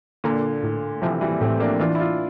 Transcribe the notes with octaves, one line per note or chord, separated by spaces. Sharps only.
A#2 D3 A#3
A2
C3 E3 F3
E3 G3
A2 A3 C4
A#3 D4
E3 D4 F4
E4
D4 F4